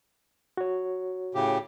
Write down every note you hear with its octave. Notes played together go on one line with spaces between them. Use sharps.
F#4 C#5
A2 C#3 G4